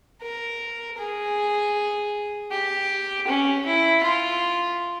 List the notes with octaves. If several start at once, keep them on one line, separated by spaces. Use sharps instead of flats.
A#4
G#4
G4
C#4
E4
F4